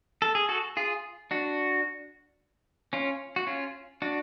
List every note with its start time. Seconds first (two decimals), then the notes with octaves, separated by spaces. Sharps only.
0.22 A4
0.35 G#4
0.49 F#4 A4
0.77 F4 G#4
1.31 D4 F#4
2.93 C#4 F4
3.36 F#4
3.47 C#4 F4
4.02 D4 F#4